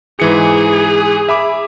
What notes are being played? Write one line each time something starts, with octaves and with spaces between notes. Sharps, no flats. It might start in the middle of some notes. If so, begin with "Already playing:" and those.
G#2 E3 G#4 C#7
E5 B5 D6